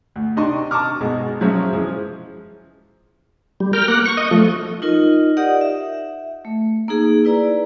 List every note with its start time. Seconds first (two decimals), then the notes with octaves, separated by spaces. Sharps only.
0.16 D2
0.36 C3 D#3 D4 D#5 C6 C#6
0.71 A5 A#5 C#6 D6 F6
1.01 G#1 B2 G#3
1.41 F3 F#3 G#3 C#4 F#4 E5
1.73 E3 F3 G#3
3.60 G3
3.73 A#4 G5 F6
3.88 A#3 F#5
4.06 C#6
4.17 D#5
4.31 F3 A3
4.82 D#4 F4 A#4 D#5
5.37 G4 A#4 D5 D#5 F#5 D#6
5.61 E5
6.45 A3
6.88 A#3 D#4 G#4
7.25 E4 B4 D5 A#5